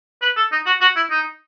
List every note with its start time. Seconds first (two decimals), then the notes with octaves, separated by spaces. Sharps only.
0.22 B4
0.37 A4
0.52 D#4
0.66 F#4
0.81 F#4
0.96 E4
1.11 D#4